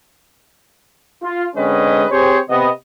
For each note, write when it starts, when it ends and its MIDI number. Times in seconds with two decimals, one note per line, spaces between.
1.23 1.46 65
1.56 2.06 50
1.56 2.06 56
1.56 2.06 60
1.56 2.06 61
1.56 2.06 71
1.56 2.06 75
2.11 2.39 60
2.11 2.39 67
2.11 2.39 68
2.11 2.39 72
2.11 2.39 73
2.50 2.70 48
2.50 2.70 59
2.50 2.70 75